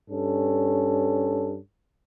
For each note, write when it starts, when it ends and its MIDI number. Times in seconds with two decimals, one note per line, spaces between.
0.10 1.57 43
0.10 1.57 61
0.10 1.57 69